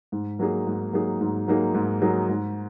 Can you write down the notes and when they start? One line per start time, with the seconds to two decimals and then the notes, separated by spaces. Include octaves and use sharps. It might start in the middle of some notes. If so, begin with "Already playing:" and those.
0.12 G#2
0.39 F#3 A#3 D#4 G#4
0.67 G#2
0.93 F#3 A#3 D#4 G#4
1.21 G#2
1.48 F#3 A#3 D#4 G#4
1.75 G#2
2.02 F#3 A#3 D#4 G#4
2.29 G#2